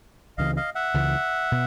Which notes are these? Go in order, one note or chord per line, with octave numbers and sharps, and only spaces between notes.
C#2 C#3 E3 D#5 F5
D#5 F5
E5 F#5
C#2 C#3 E3
B2